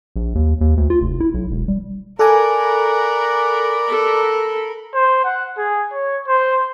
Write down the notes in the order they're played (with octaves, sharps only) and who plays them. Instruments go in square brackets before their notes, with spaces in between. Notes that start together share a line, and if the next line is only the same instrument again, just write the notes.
[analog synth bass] A#1
D#2
D#2
D2
F4
F1
E4
B1
E1
G3
[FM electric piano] A4 G#5 [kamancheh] A#4 B5 [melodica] D5 F#5 A#5
[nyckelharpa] A4
[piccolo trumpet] C5
F#5
G#4
C#5
C5